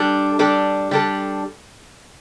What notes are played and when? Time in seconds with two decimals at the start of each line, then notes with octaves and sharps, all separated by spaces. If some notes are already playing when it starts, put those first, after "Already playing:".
Already playing: G3 D4 A4
0.39 G3 D4 A4
0.91 G3 D4 A4